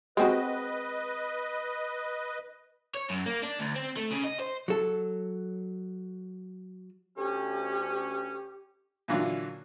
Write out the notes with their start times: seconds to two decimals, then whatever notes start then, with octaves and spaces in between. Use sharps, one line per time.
0.17 G#3 C4 F#4 B4 D#5
2.95 C#5
3.10 F#2
3.26 A#3
3.42 D4
3.59 D2
3.75 C4
3.97 A3
4.11 C#3
4.24 D#5
4.40 C5
4.68 F#3 A4
7.16 D2 C#4 G4
9.08 A#2 D3 E3 F#3 D4 F4